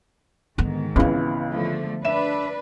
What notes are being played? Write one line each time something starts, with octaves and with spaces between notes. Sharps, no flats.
G#2 D3 D#3 B3
C#2 C#3 E3 B3 C4
D3 F3 A3
D4 B4 E5 E7